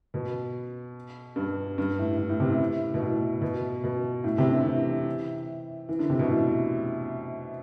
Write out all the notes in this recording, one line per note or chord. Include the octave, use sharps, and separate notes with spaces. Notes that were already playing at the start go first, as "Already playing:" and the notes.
B2
G2
G2
A2
A2
A2
C3
A2
B2
A2
B2
B2
A2
C3
D3
E3
E3
D3
C3
B2
A2